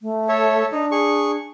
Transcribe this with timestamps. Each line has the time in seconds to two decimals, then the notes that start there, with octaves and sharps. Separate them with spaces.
0.02 A3
0.29 A4 C#5 E5
0.72 D4 D#4
0.91 G#4 C#6